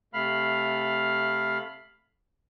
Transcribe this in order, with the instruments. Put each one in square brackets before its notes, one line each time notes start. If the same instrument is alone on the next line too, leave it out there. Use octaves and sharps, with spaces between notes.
[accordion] C3 A3 F5 B5 F6